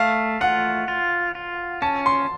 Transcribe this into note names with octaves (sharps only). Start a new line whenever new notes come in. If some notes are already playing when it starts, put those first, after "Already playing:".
Already playing: A3 F5
F4 F#5
F4
F4
C#4 A5
C6